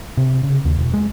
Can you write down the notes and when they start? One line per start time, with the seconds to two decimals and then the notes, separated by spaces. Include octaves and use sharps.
0.17 C3
0.43 C#3
0.65 D#2
0.79 E1
0.94 G#3